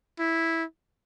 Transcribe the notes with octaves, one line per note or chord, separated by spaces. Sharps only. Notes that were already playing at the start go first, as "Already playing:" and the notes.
E4